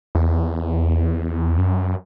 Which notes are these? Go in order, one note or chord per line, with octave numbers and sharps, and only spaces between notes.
E2
F#2